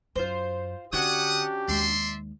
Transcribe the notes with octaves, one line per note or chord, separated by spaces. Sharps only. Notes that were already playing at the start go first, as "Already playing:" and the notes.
F#2 F4 C5
D3 C#4 D4 F#4 G4 F#5 D#6
D#2 G#3 D5 E5 C6